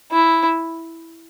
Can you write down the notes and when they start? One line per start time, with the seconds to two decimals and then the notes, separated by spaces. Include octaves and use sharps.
0.11 E4